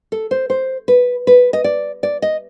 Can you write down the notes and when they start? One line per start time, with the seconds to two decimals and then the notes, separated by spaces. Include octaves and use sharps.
0.12 A4
0.31 C5
0.50 C5
0.88 B4
1.27 B4
1.53 D#5
1.64 D5
2.03 D5
2.22 D#5